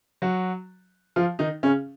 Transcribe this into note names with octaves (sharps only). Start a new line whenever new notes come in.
F#3 F#4
F3 F4
D#3 D#4
C#3 C#4